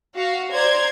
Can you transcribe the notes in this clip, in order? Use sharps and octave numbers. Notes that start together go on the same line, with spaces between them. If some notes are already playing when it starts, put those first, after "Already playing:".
F#4 F5
C5 D5 A#5 C6 G#6